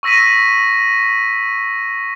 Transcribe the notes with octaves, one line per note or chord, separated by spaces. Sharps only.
C#6 E6 A#6 B6 D#7